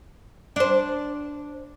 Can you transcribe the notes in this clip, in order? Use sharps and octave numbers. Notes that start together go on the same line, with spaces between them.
D4 C5